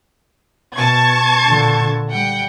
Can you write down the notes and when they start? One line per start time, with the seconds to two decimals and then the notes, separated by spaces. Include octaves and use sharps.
0.75 B2 A5 C#6 G#6
1.45 A#2 D3
2.11 G3 F#5 G5